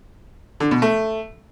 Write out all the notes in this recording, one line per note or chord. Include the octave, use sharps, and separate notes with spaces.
D3
B2
A3